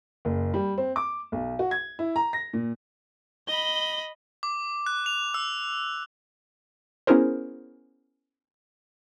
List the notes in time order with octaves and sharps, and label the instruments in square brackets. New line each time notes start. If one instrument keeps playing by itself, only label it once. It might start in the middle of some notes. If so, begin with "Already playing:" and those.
[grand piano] F#1
G3
C4
D6
B1
F#4
G#6
E4
A#5
A#6
A#2
[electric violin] D#5 B5 [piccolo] G7
[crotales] D6
F#6
F7
E6
[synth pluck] B3 C#4 E4 G#4 A#4 C5